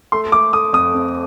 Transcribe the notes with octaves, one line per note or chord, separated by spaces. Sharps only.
A3 C6
A3 D6
A3 D#6
F2 D#6
C4